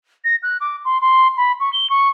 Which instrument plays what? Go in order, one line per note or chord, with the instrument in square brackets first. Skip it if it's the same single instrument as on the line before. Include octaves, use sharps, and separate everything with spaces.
[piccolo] A#6
F#6
D6
C6
C6
B5
C#6
G7
C#6